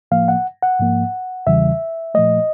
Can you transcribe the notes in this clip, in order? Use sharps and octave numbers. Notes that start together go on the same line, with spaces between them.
A2 F3 A#3 F5
F#5
F#5
G#2 F3 A#3
E2 C#3 E3 G3 E5
A#2 F3 A3 D#5